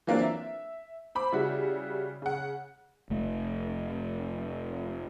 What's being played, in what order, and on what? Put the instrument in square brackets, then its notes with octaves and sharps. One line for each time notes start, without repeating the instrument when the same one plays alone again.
[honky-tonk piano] E3 F#3 A#3 C4 D4 F4
E5
C5 B5 D6
C#3 G3 E4 F#4
C#3 F#5
[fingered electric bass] F1 A3